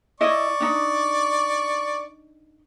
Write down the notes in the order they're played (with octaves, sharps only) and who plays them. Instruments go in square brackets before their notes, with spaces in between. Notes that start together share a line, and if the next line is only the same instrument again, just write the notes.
[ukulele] E4 D#5 [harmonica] D5 C#6
[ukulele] D4 D#4